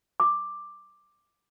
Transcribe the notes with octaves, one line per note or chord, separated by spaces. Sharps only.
D6